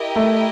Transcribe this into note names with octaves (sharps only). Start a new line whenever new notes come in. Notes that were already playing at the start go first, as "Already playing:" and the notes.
Already playing: E4 G4 A#4 D#5 G5
A3